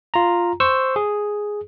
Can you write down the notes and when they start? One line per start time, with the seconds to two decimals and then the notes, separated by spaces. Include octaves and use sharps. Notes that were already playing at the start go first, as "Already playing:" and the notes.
0.14 F4 A#5
0.60 C5 C#6 E6
0.96 G#4